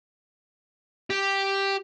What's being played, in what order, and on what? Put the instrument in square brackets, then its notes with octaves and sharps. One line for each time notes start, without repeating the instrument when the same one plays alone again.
[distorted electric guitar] G4